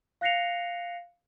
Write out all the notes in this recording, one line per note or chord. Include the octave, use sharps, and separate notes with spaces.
F5 F#6 A#6 C7 C#7 F7